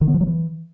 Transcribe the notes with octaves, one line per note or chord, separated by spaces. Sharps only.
D#3
B3
F3
F#3
E3